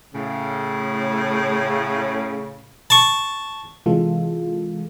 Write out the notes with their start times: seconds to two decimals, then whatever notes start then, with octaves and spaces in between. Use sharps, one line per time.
0.14 A2 C#3
2.90 A5 C#6
3.86 C3 E3 G#3 F4 A4